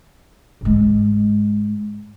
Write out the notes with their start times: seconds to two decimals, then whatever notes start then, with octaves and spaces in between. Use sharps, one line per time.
0.61 G#2 G#3